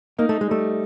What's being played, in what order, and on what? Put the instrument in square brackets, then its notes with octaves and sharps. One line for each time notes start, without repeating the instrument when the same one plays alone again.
[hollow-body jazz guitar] A#3 [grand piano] D#4
[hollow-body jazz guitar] A3
G#3
[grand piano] G3 [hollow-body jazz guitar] A3